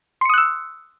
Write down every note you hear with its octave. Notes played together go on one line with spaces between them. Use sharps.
C6 D#6 E6 F#6 C#7